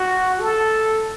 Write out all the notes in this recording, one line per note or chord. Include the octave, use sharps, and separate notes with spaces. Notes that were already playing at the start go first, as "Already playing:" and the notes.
Already playing: F#4
A4